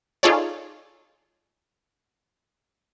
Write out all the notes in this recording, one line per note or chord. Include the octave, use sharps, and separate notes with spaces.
D#4 F4 G#4 A4 C#5 D5